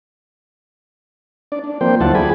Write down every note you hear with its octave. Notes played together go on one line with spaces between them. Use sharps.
D4 D5
D4
F3 A#3 C4 C5 G5
D2 F#3 E4 F4 F#5 A5
G#4 D5 G#5 B5